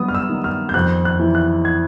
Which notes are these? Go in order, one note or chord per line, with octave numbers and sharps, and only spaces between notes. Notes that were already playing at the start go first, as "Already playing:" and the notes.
Already playing: G2 F#3 B3 D#6
F6
E6
D#3
F6
G6
F2 F#6
F#6
E3
F#6
G#6